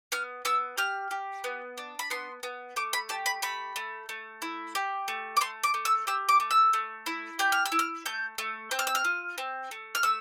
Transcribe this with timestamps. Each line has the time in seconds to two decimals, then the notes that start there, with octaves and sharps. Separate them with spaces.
0.12 B3 F6
0.45 B3 E6
0.78 G4 F6
1.11 G4
1.44 B3
1.78 D4
1.99 B5
2.10 B3 C6
2.43 B3
2.76 A3 D6
2.93 B5
3.09 G4 A5
3.26 B5
3.42 A3 B5
3.76 A3
4.09 A3
4.42 E4
4.75 G4
5.08 A3
5.37 D6
5.41 A3 C6
5.64 D6
5.74 A3
5.85 E6
6.07 G4 E6
6.29 D6
6.40 A3
6.51 E6
6.73 A3
7.06 E4
7.39 G4 G6
7.52 F6
7.66 E6
7.72 E4
7.79 F6
8.06 A3 G6
8.38 A3
8.71 C4 G6
8.79 F6
8.87 E6
8.95 F6
9.05 F4
9.38 C4
9.71 A3
9.95 F6
10.03 A3 E6